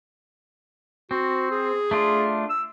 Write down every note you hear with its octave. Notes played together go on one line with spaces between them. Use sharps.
C4 F#4
G#4
A3 D4 F4
E6